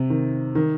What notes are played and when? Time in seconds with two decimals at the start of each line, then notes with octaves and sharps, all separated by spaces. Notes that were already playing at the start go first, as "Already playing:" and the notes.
Already playing: C3
0.10 D#3
0.55 D#3